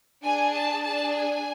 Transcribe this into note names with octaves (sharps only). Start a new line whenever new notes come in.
D4 G#4 G#5
A5
D4 G#4 A5
G#5